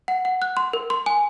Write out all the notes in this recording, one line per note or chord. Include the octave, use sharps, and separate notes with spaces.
F#5
F#5
F#6
C6
A#4
C6
G#5